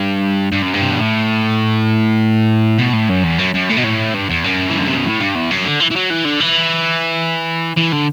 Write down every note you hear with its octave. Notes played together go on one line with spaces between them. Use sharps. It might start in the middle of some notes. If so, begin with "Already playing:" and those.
Already playing: G2
G2
F#2
G2
C3
B2
A2
B2
A2
F#2
E2
F#2
F#2
A2
B2
A2
G2
E2
F#2
E3
D3
C3
B2
A2
G2
E2
F#2
D3
E3
E3
F#3
E3
D3
E3
E3
D3